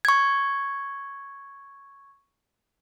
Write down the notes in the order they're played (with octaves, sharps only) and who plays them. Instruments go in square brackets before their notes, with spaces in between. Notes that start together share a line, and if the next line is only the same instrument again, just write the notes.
[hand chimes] C#6 G#6